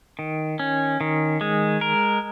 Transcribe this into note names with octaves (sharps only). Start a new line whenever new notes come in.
D#3
C#4
D#3
G#3
A#4